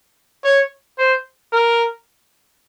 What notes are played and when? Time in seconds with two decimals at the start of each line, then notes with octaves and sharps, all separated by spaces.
0.44 C#5
0.98 C5
1.53 A#4